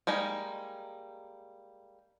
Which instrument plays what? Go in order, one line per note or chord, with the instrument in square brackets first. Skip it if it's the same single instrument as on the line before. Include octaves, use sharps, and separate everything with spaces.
[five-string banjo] G3 G#3 A#3 D#4